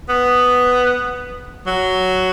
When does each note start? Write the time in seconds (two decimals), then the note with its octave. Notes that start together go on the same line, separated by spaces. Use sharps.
0.09 B3
1.67 F#3